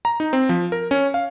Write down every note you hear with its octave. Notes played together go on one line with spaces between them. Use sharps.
A#5
D#4
C4
F3
A#4
C#4
F5